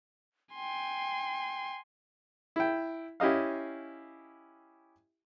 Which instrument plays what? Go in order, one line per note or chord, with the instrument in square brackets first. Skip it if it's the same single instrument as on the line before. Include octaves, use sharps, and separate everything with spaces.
[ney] G5 [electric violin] G#5 C6
[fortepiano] E4 G5
C#4 E4 G4 D#5 F5